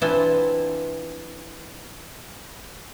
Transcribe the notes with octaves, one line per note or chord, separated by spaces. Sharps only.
E3 C4 D4 E4 F4